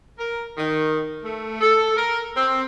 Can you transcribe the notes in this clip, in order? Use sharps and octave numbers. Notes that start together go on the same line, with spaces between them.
A#4
D#3
A3
A4
A#4
C4